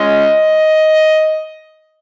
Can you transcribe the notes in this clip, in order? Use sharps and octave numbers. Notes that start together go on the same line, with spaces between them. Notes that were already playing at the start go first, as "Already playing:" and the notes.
Already playing: G#3 C#4 F4 D#5